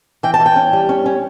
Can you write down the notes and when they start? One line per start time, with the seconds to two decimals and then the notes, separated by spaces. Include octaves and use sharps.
0.23 E3 G5
0.34 A5
0.40 E3
0.46 G5
0.56 C#4
0.73 G3
0.89 C#4
1.06 C#4